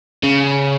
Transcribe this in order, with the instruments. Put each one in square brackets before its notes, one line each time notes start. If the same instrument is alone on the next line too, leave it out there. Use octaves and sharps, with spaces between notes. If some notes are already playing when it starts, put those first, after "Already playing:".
[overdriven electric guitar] C#3